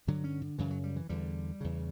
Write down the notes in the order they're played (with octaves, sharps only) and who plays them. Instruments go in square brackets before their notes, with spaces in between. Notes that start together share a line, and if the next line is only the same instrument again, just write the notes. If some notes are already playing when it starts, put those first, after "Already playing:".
[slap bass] G2 D3 F#3
C#4
D3
F#2 C#3 E3
F#3
G3
E3
E2 D3 G3
E2 C#3